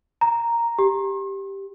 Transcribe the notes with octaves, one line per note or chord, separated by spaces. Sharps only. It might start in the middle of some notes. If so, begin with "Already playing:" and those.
A#5
G4